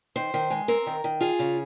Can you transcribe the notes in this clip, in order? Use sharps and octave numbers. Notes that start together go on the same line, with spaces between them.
D#3 C5
D#3
G#3
C4 A#4
D#3
D#3
F4 G#4
C#3